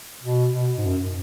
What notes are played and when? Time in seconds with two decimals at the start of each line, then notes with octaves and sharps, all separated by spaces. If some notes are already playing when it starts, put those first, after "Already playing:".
0.24 B2
0.55 B2
0.78 G#2
0.85 F#2